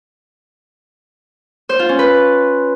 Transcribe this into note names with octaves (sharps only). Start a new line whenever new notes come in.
C5
F4
C#4
B4